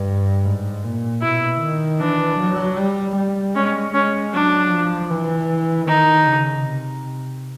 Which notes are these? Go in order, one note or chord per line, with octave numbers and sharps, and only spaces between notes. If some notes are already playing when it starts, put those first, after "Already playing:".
Already playing: G2
G#2
A#2
B2 E4
D#3
E3 D4
F#3
G3
G3
G#3 C#4
G#3 C#4
F#3 D4
F3
E3
D#3 D#4
C#3
C3